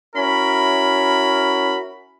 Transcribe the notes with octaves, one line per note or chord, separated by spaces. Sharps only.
C#4 E4 F#4 A#4 B5